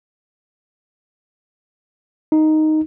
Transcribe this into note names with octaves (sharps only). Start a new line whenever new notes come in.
D#4